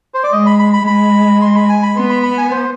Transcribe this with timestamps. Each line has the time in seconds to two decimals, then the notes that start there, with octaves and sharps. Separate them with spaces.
0.14 C5
0.24 D5
0.32 G#3 D#5
0.46 B5
0.59 B5
0.73 B5
0.87 G#3 B5
1.42 C6
1.56 B5
1.69 G#5
1.83 B5
1.96 B3 C6
2.10 B5
2.23 B5
2.38 G#5
2.51 C5